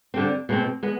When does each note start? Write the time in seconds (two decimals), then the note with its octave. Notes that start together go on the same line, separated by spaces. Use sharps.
0.14 D3 G3 C4
0.49 B2 G#3 C4
0.83 G#3 B3